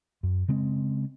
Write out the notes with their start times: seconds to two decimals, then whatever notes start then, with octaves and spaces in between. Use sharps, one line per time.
0.23 F#2
0.48 C#3 G#3 C4